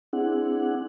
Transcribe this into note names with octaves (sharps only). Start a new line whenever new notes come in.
C4 D4 E4 G#4 F#5